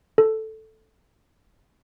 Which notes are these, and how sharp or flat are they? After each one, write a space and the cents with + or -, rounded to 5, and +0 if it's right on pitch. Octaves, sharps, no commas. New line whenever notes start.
A4 +0